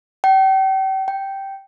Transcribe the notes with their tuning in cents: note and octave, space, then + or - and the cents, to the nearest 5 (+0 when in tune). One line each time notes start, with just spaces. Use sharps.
G5 -35
G5 -5